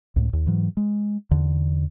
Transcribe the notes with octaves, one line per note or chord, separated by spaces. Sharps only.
C#2 A2
D#2
G#2 E3 F#3
G#3
E2 D3